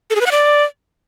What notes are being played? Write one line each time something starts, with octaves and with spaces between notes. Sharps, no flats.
A4
G#4
B4
F#5
D5